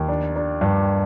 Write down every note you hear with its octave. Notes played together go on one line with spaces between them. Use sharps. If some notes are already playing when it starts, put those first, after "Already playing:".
Already playing: D#2
D4
D4
G2